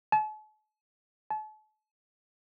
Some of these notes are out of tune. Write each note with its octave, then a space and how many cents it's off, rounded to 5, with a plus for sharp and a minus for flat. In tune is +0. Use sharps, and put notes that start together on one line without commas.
A5 -45
A5 -40